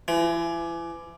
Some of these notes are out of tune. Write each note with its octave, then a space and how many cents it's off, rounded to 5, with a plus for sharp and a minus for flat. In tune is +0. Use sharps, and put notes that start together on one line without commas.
E3 +35